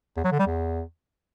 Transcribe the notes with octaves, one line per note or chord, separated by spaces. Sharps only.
E2
F#3
D3
G3
E2